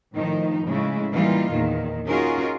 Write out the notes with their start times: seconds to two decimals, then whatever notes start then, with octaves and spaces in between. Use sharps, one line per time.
0.15 A2 D#3 F3 D#4
0.66 A2 C#3 G#3 E4
1.11 E3 G3 A#3 D#4 F4
1.50 E2 A#2 D#3
2.07 C#4 D#4 F4 F#4 G#4 A#4